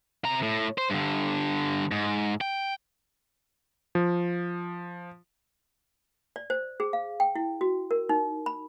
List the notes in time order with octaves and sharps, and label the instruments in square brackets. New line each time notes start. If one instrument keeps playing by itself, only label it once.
[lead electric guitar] C3 A#5
A2
C5
G2 D3
G#2
G5
[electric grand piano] F3
[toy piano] D5
C5
G#4
F5
G5
E4
F#4
A#4
D#4
B5